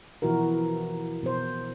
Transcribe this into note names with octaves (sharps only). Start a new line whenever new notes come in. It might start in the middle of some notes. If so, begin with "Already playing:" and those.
B2 E3 F3 E4 F#4 A#4
B2 C5